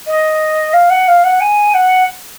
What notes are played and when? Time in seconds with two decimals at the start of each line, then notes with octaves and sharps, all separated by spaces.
0.07 D#5
0.73 F5
0.90 F#5
1.08 F5
1.24 F#5
1.40 G#5
1.74 F#5